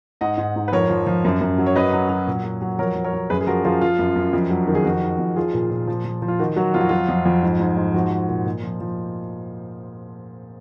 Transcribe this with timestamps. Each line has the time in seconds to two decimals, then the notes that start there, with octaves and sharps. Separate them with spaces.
0.21 G#2 D#5 F#5
0.38 G#2
0.56 G#2
0.68 B4
0.72 F2 A#4 C#5
0.90 F3
1.07 F3
1.25 F#2
1.41 F#2
1.58 F#3
1.66 C#5
1.76 F#3 B4 D#5
1.93 F#3
2.09 F#3
2.27 A#2
2.44 F#3
2.62 F#3
2.78 F2 A#4 C#5
2.95 F#3
3.04 A#4 C#5
3.13 F#3
3.30 F#2 G#4 B4
3.41 G#4
3.47 F3 F#4 A#4
3.65 F3 F4 G#4
3.81 F3 F4
3.99 F#2
4.16 F#2
4.33 F2
4.50 F#3
4.68 D#3
4.75 G#4
4.85 F2 F#4
5.02 D#3
5.19 F2
5.36 F3 F4 G#4
5.54 A#2
5.70 A#2
5.87 F3
6.05 F3
6.22 F3
6.28 F4
6.39 D#3 F#4
6.56 F#3 F#4
6.74 F2 F4
6.81 F#4
6.89 F#3 F4
7.08 F2
7.25 F2
7.43 G#2
7.60 G#2
7.77 G#2
7.94 F3 F#4
8.11 F3
8.29 A#2
8.45 A#2
8.63 F3
8.81 F3